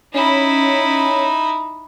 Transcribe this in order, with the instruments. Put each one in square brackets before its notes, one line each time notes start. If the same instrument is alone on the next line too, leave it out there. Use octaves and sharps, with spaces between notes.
[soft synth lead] C#4 [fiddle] D#4 E4